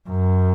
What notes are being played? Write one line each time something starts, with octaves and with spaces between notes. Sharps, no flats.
F#2